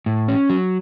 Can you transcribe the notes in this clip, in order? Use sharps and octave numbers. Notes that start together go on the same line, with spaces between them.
A2
C#4
F#3